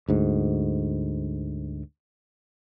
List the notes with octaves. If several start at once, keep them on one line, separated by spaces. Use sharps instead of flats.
D2 G#2